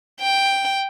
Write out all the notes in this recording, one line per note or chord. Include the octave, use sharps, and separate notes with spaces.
G5